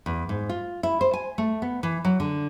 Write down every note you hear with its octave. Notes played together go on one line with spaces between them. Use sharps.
E2
G#2
F4
E4
C5
G#5
A3
B3
E3
F#3
D3